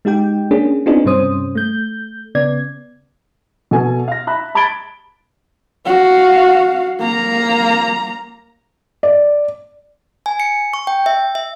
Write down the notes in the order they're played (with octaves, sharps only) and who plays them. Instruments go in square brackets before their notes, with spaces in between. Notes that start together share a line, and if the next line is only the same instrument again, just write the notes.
[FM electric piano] G#3 D#4 G4 G5
A#3 C#4 D4 G#4
B3 C4 D4 D#4 F4 G#4
G2 C3 G3 C#4 C5 D#6
A3 G6
C#3 B3 D5 G#6
[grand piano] B2 A4 G#5
F5 A#6
E5 B5 F#6
A5 B5 G#6 A6 D7 G7
[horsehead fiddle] F#4 F5
A#3 A#5
[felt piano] D5
[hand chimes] G#5
C#7
C#6
G5
E5
E5